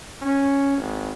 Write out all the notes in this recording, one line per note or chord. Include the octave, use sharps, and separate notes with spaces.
C#4
G#1